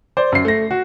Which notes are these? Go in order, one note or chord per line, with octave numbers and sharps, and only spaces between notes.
C5 D5
F#2 C7
A3 A#6
F#4